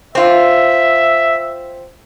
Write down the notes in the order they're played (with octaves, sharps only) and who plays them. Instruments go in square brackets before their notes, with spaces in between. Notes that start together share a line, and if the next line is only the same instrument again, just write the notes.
[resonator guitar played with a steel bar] C4 F4 [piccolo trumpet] E5